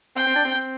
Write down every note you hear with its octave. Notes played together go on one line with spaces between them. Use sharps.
C4 G5
C4
D4
C4
C4